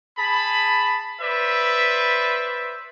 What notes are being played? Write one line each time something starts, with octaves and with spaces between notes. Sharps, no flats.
G#4 A5 B5
B4 C5 D5 E5